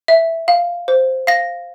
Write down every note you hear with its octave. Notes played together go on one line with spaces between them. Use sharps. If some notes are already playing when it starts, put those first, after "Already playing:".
E5
F5
C5
F5 A#6